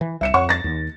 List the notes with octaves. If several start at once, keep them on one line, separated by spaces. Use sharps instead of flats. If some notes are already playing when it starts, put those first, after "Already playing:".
E3
C2 E5 C#7 E7
F2 C#5 F#5 C#6
A6 A#6
D#2